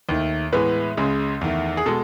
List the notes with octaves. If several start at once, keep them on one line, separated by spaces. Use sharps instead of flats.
D#2 D#3 A3
A2 E3 G#3 B3 B4
C#2 C#3 G#3
E2 D#3 A3
G#4
B2 G#3 A4